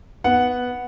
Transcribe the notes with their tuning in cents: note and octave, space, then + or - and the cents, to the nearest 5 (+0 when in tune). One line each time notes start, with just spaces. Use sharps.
B3 +0 F#5 +0